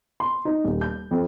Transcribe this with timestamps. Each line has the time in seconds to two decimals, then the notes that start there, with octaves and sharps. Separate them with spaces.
0.20 C6
0.45 D#4
0.64 D#1
0.81 G6
1.11 F2